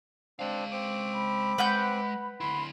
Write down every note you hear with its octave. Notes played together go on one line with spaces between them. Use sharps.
G#3 C4 D4 F5
C4 D6
B5
G#3 B4 F#5 G6
D2 E4 B5 C6